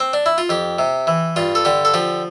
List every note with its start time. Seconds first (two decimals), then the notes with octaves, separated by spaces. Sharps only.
0.00 C4
0.13 D4
0.26 E4
0.38 F4
0.49 F2 G4
0.79 C3
1.07 E3
1.36 G2 F4
1.55 A4
1.65 D3 G4
1.85 A4
1.94 F3 G4